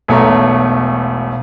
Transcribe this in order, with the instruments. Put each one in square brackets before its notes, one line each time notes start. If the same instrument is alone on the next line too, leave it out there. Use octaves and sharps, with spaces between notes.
[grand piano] E1 B1 B2 A3 C#5 A#5